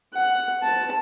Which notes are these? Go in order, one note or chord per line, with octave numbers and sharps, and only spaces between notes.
F#5
A5